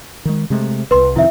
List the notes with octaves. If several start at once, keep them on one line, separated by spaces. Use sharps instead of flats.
D#3 G#3
C3 G#3 A3
E1 C2 B4 C6
F2 C3 D#3 E4 E5